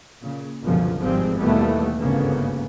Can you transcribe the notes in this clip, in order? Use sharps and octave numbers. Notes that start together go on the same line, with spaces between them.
A#2 C#3
G1 C#2 F#2 B2 F3
G#1 F3 G3 G#3 C4
D#2 B2 E3 G3 A3 B3
G1 D2 G#2 C#3 A#3 B3